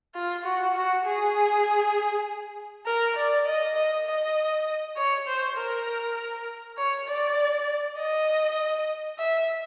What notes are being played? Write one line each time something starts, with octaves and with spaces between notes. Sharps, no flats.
F4
F#4
F#4
G#4
A#4
D5
D#5
D#5
D#5
C#5
C5
A#4
C#5
D5
D#5
E5